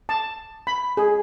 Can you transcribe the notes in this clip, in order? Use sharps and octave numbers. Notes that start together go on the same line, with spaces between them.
A5
B5
G#4